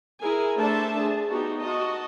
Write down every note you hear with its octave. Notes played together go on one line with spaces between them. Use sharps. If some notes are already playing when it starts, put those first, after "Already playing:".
E4 G#4 A#4 G#5
A3 D4 A4 C5 E5 A5
G#4
B3 D#4 F#4 G4
F#4 D#5 A5